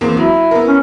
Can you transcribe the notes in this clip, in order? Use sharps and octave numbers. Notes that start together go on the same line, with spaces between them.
E2 A#3 C4
F#3 E4
B3 A#4
C#4